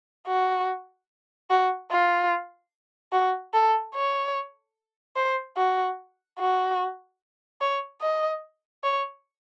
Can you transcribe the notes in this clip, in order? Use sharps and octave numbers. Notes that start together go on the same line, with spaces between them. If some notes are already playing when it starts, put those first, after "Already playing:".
F#4
F#4
F4
F#4
A4
C#5
C5
F#4
F#4
C#5
D#5
C#5